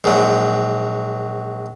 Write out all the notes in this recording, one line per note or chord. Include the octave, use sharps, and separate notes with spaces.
A#1 G#2 F#3